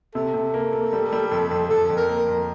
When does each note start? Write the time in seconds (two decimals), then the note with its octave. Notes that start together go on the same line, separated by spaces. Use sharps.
0.15 C3 A4
0.34 C3
0.54 A#3
0.73 A#3
0.93 G3
1.13 G3
1.32 F2
1.51 F2
1.70 F2 A4
1.90 F2
1.97 A#4
2.09 A#3
2.29 F2